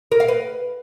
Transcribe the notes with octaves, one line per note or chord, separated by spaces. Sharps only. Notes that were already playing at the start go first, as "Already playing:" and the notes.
A#4
F5
B4